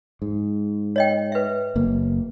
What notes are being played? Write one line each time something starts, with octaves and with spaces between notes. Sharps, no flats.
G#2
C#5 D#5 G5
B4 E5
F#1 A#3